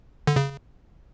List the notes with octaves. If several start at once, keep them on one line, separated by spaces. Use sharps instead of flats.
D3
C#3